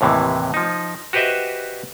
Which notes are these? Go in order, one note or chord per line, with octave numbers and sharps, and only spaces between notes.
D#2 A2 C3 E3
F3 D#4
F#4 G4 B4 C5 D#5 E5